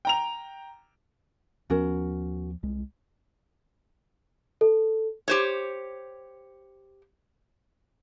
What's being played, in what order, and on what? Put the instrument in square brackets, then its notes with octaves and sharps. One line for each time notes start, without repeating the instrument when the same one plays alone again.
[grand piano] G5 A#5 F7
[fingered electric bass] D#2 F3 B3 [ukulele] C#4 F#4 A#4
[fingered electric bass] C2 G#3
[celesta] A4
[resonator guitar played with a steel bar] G4 C5 C#5